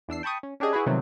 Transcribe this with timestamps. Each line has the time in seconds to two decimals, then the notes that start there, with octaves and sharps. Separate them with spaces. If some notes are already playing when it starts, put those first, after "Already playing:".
0.08 E2 D4 E6 C7
0.23 G5 A5 B5 C#6 D#6
0.43 C#4
0.60 C#4 D4 G4 G#4 D#5
0.73 E4 F#4 G#4 B4
0.86 C3 D#3 F3 F#3 A3 B3